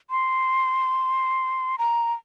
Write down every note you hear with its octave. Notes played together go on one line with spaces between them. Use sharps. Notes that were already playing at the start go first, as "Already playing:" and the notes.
C6
A#5